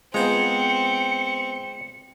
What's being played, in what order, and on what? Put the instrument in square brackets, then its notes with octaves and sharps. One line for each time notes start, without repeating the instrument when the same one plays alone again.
[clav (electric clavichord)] G#3 F4 [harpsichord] B3 C5 A#5 [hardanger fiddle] C4 [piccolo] C#7